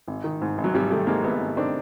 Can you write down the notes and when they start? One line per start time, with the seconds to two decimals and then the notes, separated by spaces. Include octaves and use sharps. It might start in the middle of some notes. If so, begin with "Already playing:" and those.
0.07 G#1
0.24 D#3
0.42 G#2
0.58 G#1
0.64 F#3
0.74 G#1 G3
0.91 D#3 G3 A3
1.07 G#2 G#3 A#3
1.24 G#1 A3 B3
1.40 G#1
1.57 D#3 C4 D4